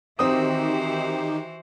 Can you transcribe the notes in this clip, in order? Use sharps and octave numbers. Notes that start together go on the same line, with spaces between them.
D#3 E3 C4 D#4 F#4 G4 C5 D#6